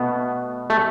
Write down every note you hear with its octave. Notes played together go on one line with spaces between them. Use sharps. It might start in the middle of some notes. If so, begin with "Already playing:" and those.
Already playing: B2 A3 B3
A3